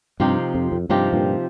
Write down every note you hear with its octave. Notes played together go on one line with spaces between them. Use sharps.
G2 C3 F3 C4 D#4 G4
F2
F2
G2 C3 F3 C4 D#4 G4
G2 A#2